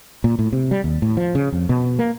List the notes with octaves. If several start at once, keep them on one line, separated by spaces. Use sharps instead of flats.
A#2
A2
C3
G3
D#2
A2
F3
C#3
F2
B2
A#3